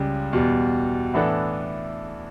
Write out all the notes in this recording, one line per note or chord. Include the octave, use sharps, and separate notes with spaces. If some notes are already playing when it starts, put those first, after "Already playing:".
Already playing: C#2 C#3 G3
E2 B2 G3
A2 E3 B3 D4 A4